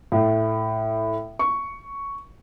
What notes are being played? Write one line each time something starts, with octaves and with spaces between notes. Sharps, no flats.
A2
C#6